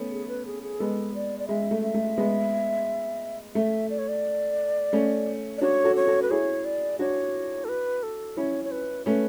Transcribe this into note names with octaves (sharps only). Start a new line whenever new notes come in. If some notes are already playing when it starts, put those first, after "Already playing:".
Already playing: A3 B3 C#4
G#4
B4
G#4
G#4
G#3 B3 A4
D5
D5
G#3 E5
A3
E5
A3
G#3 B3
A3 E5
D5
C#5
D5
A3 C#4
D5
D4 F#4 C#5
F#4 A4
C#5
F#4 A4
B4
E4 G#4 C#5
D5
D4 F#4 C#5
A4
B4
A4
C#4 E4 C#5
C#5
B4
A3 C#4 B4